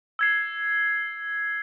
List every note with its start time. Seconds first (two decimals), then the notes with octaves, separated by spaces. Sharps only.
0.19 E6 G#6 C7